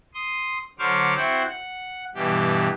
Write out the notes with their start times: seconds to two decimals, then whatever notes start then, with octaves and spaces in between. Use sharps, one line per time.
0.14 C6 D#6
0.79 D3 F#3 C5 C#6 D6 F6
1.17 C4 E4 F#4 C5 F#5 G5
1.49 F#5
2.15 G2 B2 E3 G4